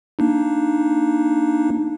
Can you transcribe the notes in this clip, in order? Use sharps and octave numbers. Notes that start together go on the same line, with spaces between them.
A#3 D4 D#4